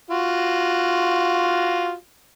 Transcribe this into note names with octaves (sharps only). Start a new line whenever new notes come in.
F4 F#4